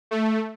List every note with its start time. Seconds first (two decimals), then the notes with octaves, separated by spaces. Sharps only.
0.11 A3